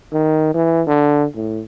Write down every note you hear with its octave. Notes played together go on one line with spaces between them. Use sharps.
D#3
E3
D3
A2